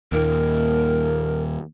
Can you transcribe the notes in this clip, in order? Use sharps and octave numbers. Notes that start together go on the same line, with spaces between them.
D#2 A#2 A#4